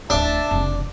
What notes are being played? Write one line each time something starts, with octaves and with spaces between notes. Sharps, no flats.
D1 A2 D4 E5 A5
F1 C#3